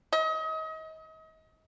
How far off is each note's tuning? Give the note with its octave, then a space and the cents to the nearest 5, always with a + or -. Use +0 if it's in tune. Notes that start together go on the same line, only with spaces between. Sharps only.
D#5 +35